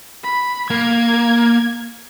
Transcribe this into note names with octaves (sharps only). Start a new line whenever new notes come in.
B5
A#3 G#6